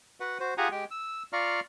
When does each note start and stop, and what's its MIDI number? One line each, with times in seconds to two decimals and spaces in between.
0.20 0.38 66
0.20 0.38 71
0.20 0.38 78
0.40 0.54 66
0.40 0.54 72
0.58 0.68 65
0.58 0.68 67
0.58 0.68 68
0.58 0.68 78
0.58 0.68 80
0.58 0.68 82
0.72 0.85 56
0.72 0.85 67
0.72 0.85 79
0.91 1.23 88
1.33 1.60 65
1.33 1.60 74
1.33 1.60 77
1.33 1.60 82
1.33 1.60 85
1.33 1.60 89